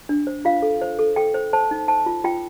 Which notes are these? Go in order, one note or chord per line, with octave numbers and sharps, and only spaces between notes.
D4
C5
F4 F5
A4
C5
A4
A4 G5
C5
C5 A5
D#4
C5 A5
F4
F4 G5